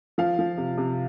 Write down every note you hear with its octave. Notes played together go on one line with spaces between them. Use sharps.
F3 F5
F3
C3
C3